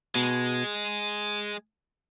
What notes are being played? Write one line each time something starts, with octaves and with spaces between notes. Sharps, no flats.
B2 G#3